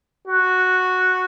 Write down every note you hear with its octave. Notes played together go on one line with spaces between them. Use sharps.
F#4